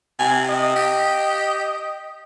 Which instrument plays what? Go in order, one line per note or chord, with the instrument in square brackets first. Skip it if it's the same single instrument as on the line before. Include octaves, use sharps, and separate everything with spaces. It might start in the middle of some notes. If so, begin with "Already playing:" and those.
[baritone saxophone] C3 [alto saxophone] G#5
[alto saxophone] D#5
[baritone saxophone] G4